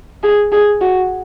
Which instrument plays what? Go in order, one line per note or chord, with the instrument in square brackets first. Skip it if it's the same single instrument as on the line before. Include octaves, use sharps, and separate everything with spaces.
[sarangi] G#4
G#4
F#4